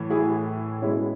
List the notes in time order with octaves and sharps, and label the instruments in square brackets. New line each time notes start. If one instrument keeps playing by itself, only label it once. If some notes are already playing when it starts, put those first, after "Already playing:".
Already playing: [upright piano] A2 E3
E4 G#4
B2 G#3 B3 C#4 E4